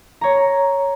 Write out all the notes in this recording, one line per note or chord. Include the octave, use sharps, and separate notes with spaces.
C#5 A#5